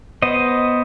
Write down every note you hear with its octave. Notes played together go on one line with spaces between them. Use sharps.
B3 C5 D#5